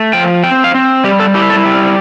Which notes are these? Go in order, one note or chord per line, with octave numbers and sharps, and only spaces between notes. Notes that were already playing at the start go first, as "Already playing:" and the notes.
Already playing: A3
F3 G5
C4 G5
F5
C4
G3 G4
A4
E4 G4
A4
G3